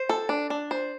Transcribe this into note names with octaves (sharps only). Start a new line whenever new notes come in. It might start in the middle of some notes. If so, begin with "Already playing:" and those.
Already playing: C5
A4
D4
D4
C5